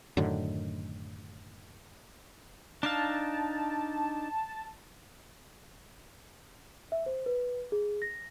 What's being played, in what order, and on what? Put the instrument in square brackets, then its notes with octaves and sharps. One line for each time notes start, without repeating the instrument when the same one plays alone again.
[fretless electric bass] F#2 A2 D3 D#3
[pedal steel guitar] D4 D#4 F5 [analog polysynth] A5
[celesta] E5
C5
B4
G#4
A#6